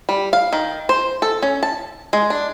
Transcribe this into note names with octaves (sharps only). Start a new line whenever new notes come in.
G3
F5
D#3
C5
A4
C#4
A5
G#3
D4